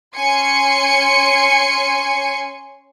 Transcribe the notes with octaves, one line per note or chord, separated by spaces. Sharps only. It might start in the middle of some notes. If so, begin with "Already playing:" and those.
C#4 G#5 C6 C#7